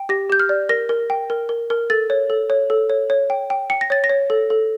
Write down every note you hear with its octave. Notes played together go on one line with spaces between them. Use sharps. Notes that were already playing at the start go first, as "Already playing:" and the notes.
Already playing: G5
G4 A#6
G4 G6
F6
D5
A#4 A#6
A#4
G5
A#4
A#4
A#4
A4 A6
C#5
A4
C#5
A4
C#5
C#5
G5
G5
G5 C#7
A#6
C#5 A6
A#6
C#5
A4
A4